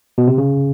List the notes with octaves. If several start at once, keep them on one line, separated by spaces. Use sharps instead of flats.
B2
C3
C#3